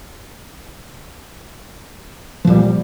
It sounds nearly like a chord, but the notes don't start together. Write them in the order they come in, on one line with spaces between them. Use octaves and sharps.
F3 A#2 G3